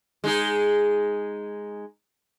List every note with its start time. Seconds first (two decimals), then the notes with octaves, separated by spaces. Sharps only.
0.24 G#3 D#4 G#4